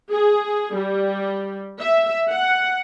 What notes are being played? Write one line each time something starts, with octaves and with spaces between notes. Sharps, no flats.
G#4
G3
E5
F#5